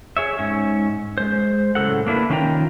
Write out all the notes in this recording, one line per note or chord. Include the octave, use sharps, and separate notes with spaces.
G#4 C#5 E5
G#2 C#4
G#3 C5
A2 C#3 F#3 A4 F#5
A#3 D4 E4 B4
D#3 C#4 D4 F4 G5 A#5